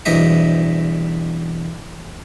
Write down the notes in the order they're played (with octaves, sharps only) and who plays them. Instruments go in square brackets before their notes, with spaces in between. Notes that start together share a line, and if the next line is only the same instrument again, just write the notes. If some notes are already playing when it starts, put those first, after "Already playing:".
[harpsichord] B1 E2 G2 C5 D#5 E5